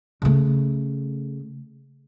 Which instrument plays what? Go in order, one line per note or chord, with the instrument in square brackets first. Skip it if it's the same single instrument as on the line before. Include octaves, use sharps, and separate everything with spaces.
[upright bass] C#3 A3